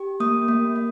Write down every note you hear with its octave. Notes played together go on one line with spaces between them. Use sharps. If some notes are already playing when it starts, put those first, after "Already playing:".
Already playing: G4
A#3 D#6
A#3
A#3